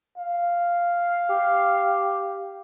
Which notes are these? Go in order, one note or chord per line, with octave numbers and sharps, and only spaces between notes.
F5
G4